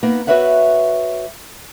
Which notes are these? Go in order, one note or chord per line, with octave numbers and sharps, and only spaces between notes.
A#3 B3 D#4
F#4 G4 B4 C#5 E5 F#5